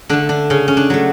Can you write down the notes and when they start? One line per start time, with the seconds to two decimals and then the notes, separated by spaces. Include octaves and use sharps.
0.09 D3 A3 D4
0.29 D4
0.50 C#3 C#4
0.68 C#4
0.77 D4
0.90 F#3 A3